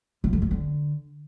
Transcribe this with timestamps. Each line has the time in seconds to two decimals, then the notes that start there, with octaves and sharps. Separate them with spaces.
0.24 C3
0.33 F2
0.42 G2
0.51 D3